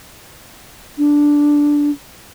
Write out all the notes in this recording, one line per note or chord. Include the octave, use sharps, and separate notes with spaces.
D4